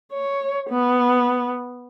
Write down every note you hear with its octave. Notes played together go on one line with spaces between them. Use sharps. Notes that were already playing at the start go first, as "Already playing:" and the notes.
C#5
B3